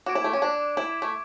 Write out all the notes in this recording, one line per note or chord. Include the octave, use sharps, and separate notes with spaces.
F#4 D6 G#6 D7
E4
A3
C#4
D4
E4
A3